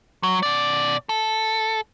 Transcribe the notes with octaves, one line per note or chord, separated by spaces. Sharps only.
F#3
B2 D5
A4